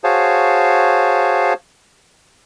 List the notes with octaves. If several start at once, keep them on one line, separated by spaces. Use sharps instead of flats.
F#4 G#4 C5 C#5 F5 A5